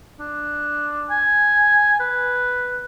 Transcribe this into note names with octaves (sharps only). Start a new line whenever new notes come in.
D4
G#5
B4